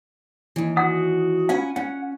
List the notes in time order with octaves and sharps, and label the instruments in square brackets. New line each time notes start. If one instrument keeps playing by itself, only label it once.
[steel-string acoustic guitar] D#2 E3
[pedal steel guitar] F#4 D#6 [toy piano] F#5
[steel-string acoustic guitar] C#4 F#5 G#5 [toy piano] F4 F5
[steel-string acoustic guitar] C#4 [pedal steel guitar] F#5